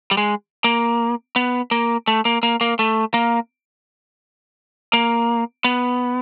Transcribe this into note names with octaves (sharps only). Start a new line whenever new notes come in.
G3
G#3
A#3
B3
A#3
A3
A#3
A#3
A#3
A3
A#3
A#3
B3